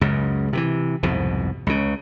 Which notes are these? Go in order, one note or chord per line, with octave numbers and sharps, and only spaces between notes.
C#2 F#2 C#3
C3 D#3 E3
C2 F2 G#2 B2
C#2 C#3